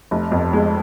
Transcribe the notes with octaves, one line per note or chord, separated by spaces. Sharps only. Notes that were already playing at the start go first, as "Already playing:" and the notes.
F1
F2
G#3